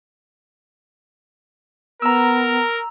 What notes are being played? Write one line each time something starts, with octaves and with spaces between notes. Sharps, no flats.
B3 A#4 A#5 E6